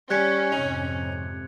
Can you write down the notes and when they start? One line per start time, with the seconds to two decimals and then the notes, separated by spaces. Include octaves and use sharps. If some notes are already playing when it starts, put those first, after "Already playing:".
0.10 G3 C#4 F#6 G#6 C#7
0.52 F2 G#2 C3 D#4